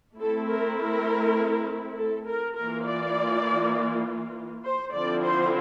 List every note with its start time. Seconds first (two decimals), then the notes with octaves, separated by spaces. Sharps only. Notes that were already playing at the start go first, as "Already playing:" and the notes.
0.19 A3 C4 E4 A4
0.49 A#4
0.79 A#4
1.97 A4
2.27 A#4
2.56 E3 A#3 F4 A#4
2.86 D5
4.65 C5
4.94 D3 F3 C4 E4 D5
5.24 C5